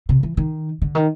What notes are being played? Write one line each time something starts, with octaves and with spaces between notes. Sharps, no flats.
C3
E3
D#3
D3
D#3